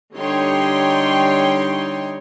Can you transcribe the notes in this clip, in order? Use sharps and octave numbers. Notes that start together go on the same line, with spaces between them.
D3 G3 D#4 C#5 G5 C6